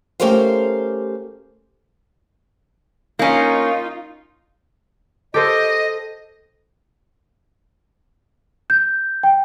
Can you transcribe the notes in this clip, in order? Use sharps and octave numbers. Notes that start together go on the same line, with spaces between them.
A3 C#4 G4 A#4 C5 F5
A#3 C#4 D#4 F4
G4 A4 C5 D#5
G6
G5